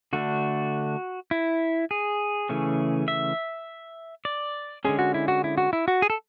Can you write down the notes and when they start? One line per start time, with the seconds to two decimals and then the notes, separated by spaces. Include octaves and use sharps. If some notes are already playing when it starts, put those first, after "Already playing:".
0.13 D3 A3 D4 F#4
1.31 E4
1.91 G#4
2.49 C#3 E3 A3 C#4
3.08 E5
4.25 D5
4.85 D3 G#3 C#4 G#4
4.99 F#4
5.14 E4
5.28 F#4
5.44 E4
5.58 F#4
5.73 E4
5.88 F#4
6.02 G#4
6.10 A4